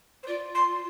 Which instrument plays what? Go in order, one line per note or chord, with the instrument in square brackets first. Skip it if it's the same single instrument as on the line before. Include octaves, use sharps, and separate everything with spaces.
[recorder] C5
[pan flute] F4 [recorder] D5
[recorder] C6